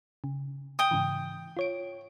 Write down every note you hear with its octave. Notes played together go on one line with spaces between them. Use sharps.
C#3
G5 D#6
G#2 C#3 E3
F4 C#5 D7